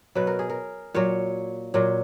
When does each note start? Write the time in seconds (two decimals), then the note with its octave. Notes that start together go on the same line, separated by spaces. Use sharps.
0.15 B2 F#3 B4
0.27 A#4
0.39 G#4
0.50 A#4
0.94 A#2 F#3 C#5
1.74 A#2 F#3